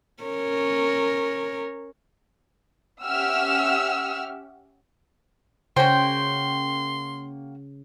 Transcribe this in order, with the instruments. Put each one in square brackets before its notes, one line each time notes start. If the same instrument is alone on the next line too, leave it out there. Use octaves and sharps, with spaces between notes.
[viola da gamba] C#4 A#4 C#5
[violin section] C#4 G4 E5 F#5 E6 F6
[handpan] C#3 [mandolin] A#3 F#4 G5 [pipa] C#4 C5 [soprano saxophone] C6